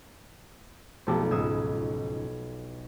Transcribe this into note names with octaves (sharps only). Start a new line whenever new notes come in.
F1 B1 D4 G4 A4 C5
C#2 G#2 D#6 E6 G#6